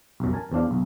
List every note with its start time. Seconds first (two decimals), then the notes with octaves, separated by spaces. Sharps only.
0.20 B1 F#2
0.33 A#4 G#5 A5
0.52 E2 C4 D4 F5
0.71 B1